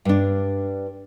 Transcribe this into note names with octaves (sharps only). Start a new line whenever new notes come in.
G2 D4